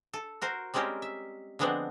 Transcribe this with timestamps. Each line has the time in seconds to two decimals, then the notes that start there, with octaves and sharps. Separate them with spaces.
0.13 A4
0.42 F#4 A#4 C5
0.74 G3 G#3 C4 C#4 G4 A#4
1.02 E5
1.59 D3 F3 G#3 B3 C4 D4